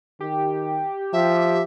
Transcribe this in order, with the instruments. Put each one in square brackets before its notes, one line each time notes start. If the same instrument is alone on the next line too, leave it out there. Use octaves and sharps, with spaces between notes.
[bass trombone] D#3 [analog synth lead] G4
[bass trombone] F3 [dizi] E5